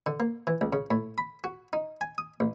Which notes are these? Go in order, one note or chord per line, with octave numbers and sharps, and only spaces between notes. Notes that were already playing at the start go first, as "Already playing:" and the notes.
D3
A#3
E3
C#2
C#3
A2
B5
F#4
D#4
G#5
D#6
A1